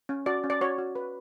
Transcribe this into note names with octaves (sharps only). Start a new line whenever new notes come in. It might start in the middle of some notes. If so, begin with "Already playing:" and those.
C#4
F#4 D5
C#4
D5
F#4 C#5
F#4
B4